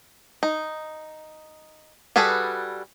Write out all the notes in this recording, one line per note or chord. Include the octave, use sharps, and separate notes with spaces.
D#4
G3 F#4 G#4 A4 B4